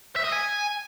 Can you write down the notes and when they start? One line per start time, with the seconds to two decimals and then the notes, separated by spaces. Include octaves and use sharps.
0.16 E5
0.24 D#5
0.32 G#5